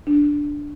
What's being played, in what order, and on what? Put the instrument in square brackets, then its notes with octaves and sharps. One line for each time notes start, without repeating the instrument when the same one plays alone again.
[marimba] D4